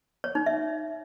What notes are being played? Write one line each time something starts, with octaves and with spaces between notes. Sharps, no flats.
C#5
D#4
E5